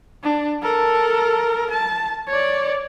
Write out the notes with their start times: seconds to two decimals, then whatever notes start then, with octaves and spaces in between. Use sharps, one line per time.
0.23 D4
0.63 A4 A#4
1.70 A5
2.28 C#5 D5